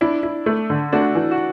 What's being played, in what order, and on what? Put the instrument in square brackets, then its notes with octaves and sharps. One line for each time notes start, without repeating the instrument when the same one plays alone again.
[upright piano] D4 [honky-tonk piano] E4
[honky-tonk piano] E4
A3
D3
[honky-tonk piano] A3 [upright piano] D4 F#4
[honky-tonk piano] E3
[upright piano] F#4